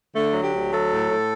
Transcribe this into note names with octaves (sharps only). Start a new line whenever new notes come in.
D3 A3
F#3
G4
D2
F#3 A4
A2
A2